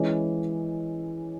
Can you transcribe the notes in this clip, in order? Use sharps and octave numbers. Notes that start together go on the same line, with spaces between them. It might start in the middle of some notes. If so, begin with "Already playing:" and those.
Already playing: E3 G#3 C#4 E4